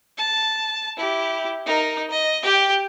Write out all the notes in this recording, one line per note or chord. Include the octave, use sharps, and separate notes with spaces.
A5
E4 G4
D#4 A#4
D#5
G4 G5